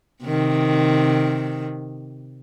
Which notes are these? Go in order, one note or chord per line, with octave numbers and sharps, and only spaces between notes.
C3 D#3